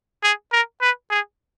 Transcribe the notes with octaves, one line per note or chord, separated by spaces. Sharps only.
G#4
A#4
B4
G#4